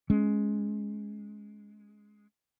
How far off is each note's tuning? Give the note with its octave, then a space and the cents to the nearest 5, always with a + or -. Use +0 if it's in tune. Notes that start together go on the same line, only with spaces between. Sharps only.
G#3 +10 C#4 +0